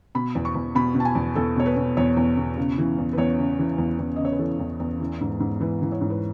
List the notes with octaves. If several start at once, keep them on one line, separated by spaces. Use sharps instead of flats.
B2 B5
E2
C#6
E2
B2 B5
B2
A5
G#5
E2
E2 A4
B2 C#5
B4
B2
E2 C#5
E2
B2
C#3
E3
E2
B4
E2 C#5
C#3
E3
E2
E2
D#5
C#3
C#5
B4
E3 A4
E2
E2
E3
G#2
G#2
E3 B4
E3
C#5
G#2
B4